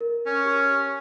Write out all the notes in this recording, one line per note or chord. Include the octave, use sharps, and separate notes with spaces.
A#4
C#4 C#5
G4 C#6